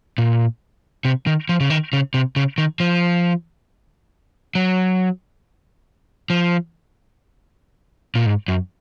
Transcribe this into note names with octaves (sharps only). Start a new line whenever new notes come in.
A#2
C3
D#3
F3
C#3
D#3
C#3
C3
C#3
D#3
F3
F#3
F3
A#2
G#2
F#2